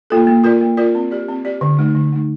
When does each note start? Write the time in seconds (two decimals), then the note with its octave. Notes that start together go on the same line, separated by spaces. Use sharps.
0.10 A#3 F4 A4
0.27 A#3
0.44 F4 A#4 D5
0.61 A#3
0.77 F4 A#4 D5
0.95 C4
1.11 G4 D5
1.28 C4
1.45 G4 D5
1.61 D3
1.78 A3 D#4
1.95 D3
2.13 A3 D#4